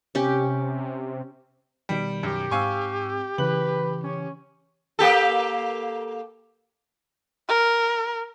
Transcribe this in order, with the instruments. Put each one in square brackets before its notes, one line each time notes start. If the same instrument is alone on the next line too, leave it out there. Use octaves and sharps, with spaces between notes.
[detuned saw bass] C3 [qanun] C#4 G4
[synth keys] B2 D#3 D7 [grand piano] G3
[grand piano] F#2 [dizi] G4
[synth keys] G#2 C4 E6 [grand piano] F5 G#5 C#6
[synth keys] C#3 E3 [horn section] B4 [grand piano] F#7
[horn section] C#4
[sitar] A#3 G4 A4
[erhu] A#4